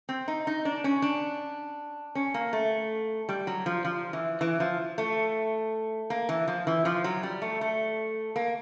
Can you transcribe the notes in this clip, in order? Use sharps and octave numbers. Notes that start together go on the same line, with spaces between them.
C4
D#4
D#4
D4
C#4
D4
C#4
A#3
A3
G3
F#3
F3
F3
E3
E3
F3
A3
A#3
E3
F3
E3
F3
F#3
G3
A3
A3
A#3